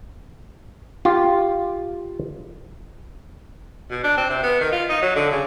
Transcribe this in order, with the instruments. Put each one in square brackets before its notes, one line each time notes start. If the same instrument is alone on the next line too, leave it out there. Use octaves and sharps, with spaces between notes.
[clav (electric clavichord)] F4 G4
[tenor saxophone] B2
D4
C4
C3
B3
D#3
F4
D#4
F#3
D3
C#3